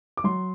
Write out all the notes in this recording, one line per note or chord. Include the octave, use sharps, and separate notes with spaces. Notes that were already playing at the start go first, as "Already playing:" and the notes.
D6
F#3 C6